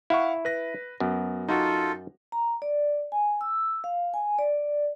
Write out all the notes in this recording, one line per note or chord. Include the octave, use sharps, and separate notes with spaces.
E4 F5 F#5 C#6
B4 A#6
F#2 B3
D#4 F4 F#4 A4
A#5
D5
G#5
E6
F5
G#5
D5